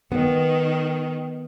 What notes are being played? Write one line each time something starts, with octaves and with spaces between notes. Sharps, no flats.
D#3 B3